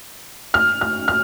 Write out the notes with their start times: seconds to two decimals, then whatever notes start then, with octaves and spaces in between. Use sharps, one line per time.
0.54 F6
0.81 F6
1.08 F6